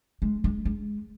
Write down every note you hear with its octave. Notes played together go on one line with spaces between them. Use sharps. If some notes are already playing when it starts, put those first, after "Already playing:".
G#3
G#3
G#3